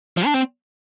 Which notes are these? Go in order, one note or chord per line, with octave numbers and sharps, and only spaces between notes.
F3
D4
C4